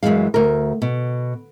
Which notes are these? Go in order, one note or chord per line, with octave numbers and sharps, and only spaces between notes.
F#2 D#3 E3 G#3 F5
D2 A#4
B2